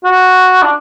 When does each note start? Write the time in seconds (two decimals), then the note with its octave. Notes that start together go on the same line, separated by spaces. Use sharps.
0.04 F#4
0.62 D4